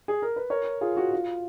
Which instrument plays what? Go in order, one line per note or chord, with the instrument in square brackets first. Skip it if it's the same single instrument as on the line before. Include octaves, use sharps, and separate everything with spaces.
[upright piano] G#4
A#4
B4
A#4 C#5
F4 G#4
F#4
F4